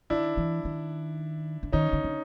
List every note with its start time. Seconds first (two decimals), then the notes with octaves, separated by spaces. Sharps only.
0.10 D#3 D4 E4
0.37 E3
0.65 D#3
1.63 D3
1.72 D#3 C#4 D#4
1.93 D3
2.04 D3